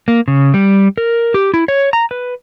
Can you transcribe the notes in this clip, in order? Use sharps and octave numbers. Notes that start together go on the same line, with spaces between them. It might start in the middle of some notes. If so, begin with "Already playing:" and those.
A#3
C#3
G3
A#4
G4
E4
C#5
A#5
B4